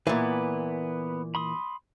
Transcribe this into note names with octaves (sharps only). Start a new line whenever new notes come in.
A#2 E3 B3 B4
B5 C6 D#6